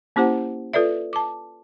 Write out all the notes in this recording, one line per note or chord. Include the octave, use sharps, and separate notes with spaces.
A#3 C#4 E4 G4 C5 F#5
F4 A4 B4 D5 E5
A5 D6